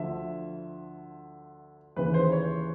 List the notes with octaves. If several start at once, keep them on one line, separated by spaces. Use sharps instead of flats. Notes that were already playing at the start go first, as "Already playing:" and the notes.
Already playing: D2 D3 F3 E5
D#2 C#3 E3 B4
C5
C#5